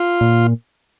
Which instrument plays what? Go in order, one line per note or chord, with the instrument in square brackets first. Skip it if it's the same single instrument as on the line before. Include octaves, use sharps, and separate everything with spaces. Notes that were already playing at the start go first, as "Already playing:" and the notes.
Already playing: [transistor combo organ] F4
[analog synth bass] A#2